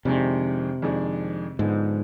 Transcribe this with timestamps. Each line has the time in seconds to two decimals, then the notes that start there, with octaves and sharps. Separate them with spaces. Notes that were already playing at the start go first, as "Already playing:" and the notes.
0.05 F2 C3 D#3 G#3 D4 G#4
0.82 F2 D#3 G#3 D4 G#4
1.59 G#2 D3 F3 G#3 B3 D#4